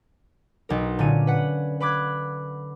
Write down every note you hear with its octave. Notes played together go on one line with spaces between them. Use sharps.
B1 A#4
A#2 D3 C#4 D#7
B4 F#5
B4 B5 D6 F#6 G#6